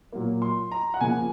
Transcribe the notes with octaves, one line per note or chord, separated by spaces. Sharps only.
A#2 F#3 A#3
C6
A#5
F#5
C#3 F3 A#3 G#5